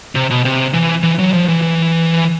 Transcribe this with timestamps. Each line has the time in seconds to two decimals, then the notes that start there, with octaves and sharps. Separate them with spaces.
0.15 C3
0.30 B2
0.45 C3
0.74 E3
1.03 E3
1.19 F#3
1.33 F3
1.48 E3
1.62 E3